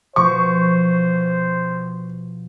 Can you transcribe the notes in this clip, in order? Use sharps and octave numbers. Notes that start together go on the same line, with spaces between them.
B2 F3 C5 C#6